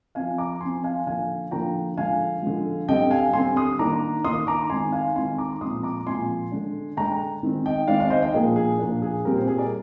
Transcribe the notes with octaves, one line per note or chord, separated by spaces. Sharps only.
F3 C4 F5 G#5
A#5 D6
F3 C4 G#5 C6
F5 G#5
D3 F3 A#3 D4 F5 G#5
D3 F3 A#3 D4 G5 A#5
D3 F3 G#3 F5 G#5
D3 F3 G#3
D3 G3 C4 D#5 G5
F5 G#5
D3 G3 C4 G#5 C6
C6 D#6
D#3 A#3 D4 A#5 D6
D#3 A#3 D4 C6 D#6
A#5 D6
D#3 G#3 C4 G#5 C6
F5 G#5
D#3 G#3 C4 G#5 C6
A#5 D6
A#2 F3 G#3 C4 C6 D#6
A#5 D6
A#2 F3 G#3 C4 G#5 C6
D3 G#3 D4
D3 G#3 D4 G5 A#5
D#3 G#3 C4
D#5 G5
D#3 G#3 C4 D5 F5
D5 F5
C5 D#5
D#5 G5
A#2 F3 A#3 D4 G#4
G#4
A#2 F3 A#3 D4
G#4
A#2 G3 C4 G4 A#4
G#4 C5
G#4
A#4 D5